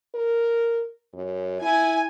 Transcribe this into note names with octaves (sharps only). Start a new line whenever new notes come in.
A#4
F#2
E4 G#5